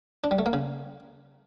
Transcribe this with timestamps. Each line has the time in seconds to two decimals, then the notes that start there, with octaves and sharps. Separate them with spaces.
0.24 D4
0.31 G3
0.39 A3
0.46 A#3
0.53 C#3